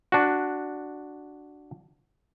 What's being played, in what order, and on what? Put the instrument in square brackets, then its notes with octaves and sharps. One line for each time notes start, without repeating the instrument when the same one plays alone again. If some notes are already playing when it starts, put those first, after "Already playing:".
[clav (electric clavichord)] D4 F#4